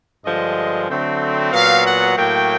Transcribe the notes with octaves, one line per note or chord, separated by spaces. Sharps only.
G2 D3 F3 G#3 D#5
D3 F#3 A3 C4
A#2 F#3 B3 F5
F#5
A2 F#3 A#3 G5